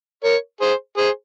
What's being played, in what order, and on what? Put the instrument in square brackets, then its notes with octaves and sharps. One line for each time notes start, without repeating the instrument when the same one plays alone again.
[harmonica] A#4 C#5
G#4 C5
G#4 C5